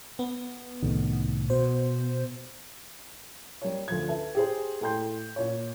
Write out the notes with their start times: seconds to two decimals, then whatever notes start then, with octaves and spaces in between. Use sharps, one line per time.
0.19 B3
0.82 C2 A2 D#3
1.50 B2 C5
3.62 G3 A#4 C#5
3.88 D2 F3 G#6
4.08 A4 B4 E5
4.35 G4 G#4 C5
4.81 A2 A3 G5 C6 G6
5.36 A#2 C#5